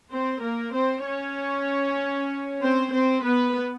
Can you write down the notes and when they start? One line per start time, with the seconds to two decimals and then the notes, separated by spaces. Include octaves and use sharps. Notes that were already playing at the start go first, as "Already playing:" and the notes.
0.11 C4 C5
0.42 A#3 A#4
0.74 C4 C5
1.05 C#4 C#5
2.62 C4 C5
2.92 C4 C5
3.24 B3 B4